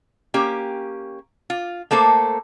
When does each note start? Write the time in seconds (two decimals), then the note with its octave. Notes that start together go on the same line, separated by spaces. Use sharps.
0.34 A#3 C#4 G4
1.50 F4
1.91 A3 A#3 A4 C5